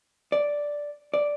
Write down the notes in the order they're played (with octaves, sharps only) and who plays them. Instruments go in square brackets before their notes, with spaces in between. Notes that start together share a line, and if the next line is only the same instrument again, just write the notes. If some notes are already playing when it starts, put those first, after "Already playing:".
[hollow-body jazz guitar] D5
D5